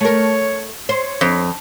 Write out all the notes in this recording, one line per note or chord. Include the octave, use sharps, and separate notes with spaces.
A3 A#4 C#5
C5 C#5
F2 C5